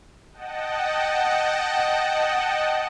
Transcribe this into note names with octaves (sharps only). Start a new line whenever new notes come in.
D#5 F#5 G5 A5